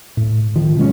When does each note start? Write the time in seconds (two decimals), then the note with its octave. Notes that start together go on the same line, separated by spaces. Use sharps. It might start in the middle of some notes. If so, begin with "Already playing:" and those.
0.17 A2
0.55 A2 D#3 F3
0.77 C3 G3 G#3 C#4